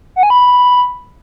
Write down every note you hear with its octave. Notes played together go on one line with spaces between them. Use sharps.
F#5
G#5
B5